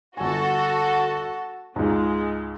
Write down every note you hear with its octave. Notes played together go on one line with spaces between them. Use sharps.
G1 F#4 A4 G#5
C#2 G#2 G#3